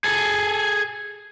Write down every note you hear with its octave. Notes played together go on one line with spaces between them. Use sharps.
G#4 A4